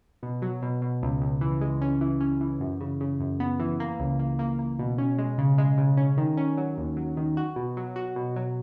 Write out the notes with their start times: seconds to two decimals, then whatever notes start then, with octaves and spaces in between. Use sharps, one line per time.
0.23 B2
0.42 F#3
0.62 B2
0.82 B2
1.02 C#2
1.21 C#2
1.41 E3
1.61 G#3
1.81 C#4
2.01 E3
2.21 C#4
2.41 E3
2.60 F#2
2.80 C#3
3.01 C#3
3.20 F#2
3.40 B3
3.60 E3
3.80 A#3
3.99 C#2
4.19 A#3
4.39 A#3
4.59 A#3
4.79 B2
4.98 C#4
5.18 G#3
5.38 C#3
5.58 G#3
5.78 C#3
5.97 C#4
6.17 D#3
6.37 C#4
6.58 F#3
6.77 D#2
6.97 F#3
7.17 D#3
7.37 F#4
7.56 B2
7.77 F#3
7.96 F#4
8.16 B2
8.36 F#3